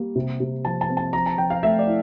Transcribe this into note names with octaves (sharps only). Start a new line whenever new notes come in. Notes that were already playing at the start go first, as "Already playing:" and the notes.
Already playing: G3 A#3
C3
C3
F3 A5
A5
C4
A5
F3 A#5
A5
F3 G5
F5
A3 E5
D5
E4